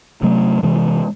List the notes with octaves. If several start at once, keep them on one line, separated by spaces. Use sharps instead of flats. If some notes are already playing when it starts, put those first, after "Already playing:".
C3 F#3 A3
C3 E3 G#3